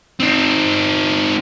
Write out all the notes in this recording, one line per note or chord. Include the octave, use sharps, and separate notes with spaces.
C4 D#4